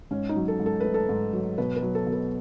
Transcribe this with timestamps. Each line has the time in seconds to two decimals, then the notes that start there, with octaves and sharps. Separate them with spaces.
0.11 G#2 C#4
0.29 D#4
0.36 F#3
0.48 A4
0.60 G#2
0.66 A4
0.80 A3 B4
0.94 A4
1.09 G#2
1.33 F#3
1.58 B2 B4
1.76 B4
1.82 F#3
1.95 A4
2.07 B2
2.13 B4